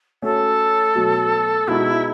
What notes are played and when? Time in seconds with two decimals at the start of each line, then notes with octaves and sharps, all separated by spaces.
0.22 A3 C#4 F#4 A4 C#5
0.95 B2 F#3 A3
1.67 B2 G#3 D#4 E4 F#4